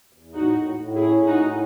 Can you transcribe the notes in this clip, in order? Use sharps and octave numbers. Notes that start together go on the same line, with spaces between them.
E2
A2 D#4 F#4
A2
A2
C#4 E4 G#4
A2
D#4 F#4
A2